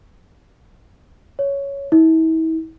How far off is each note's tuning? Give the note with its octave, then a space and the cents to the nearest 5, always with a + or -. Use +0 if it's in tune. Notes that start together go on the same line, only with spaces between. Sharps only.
C#5 +5
E4 -40